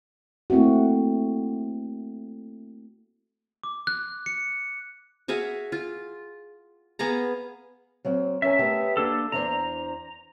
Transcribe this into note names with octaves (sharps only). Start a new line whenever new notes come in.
A3 A#3 C4 E4 F#4
D6
F#6
C#7
F#4 G#4 E5 F5
F4
B3 G#4 F5 A#5
F#3 A#3 C4
C#4 A#4 E5 G#5
A3 B3 G4
A#3 D4 A4
E2 D4 C5 A#5